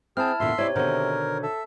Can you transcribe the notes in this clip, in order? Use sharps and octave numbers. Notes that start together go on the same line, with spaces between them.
C4 E4 G#4 G5 A5 F6
E2 A#2 D3 E5 C6
C3 E4 C#5 D5
B2 D3 D#3 A#4 C5 C#5
A4 E5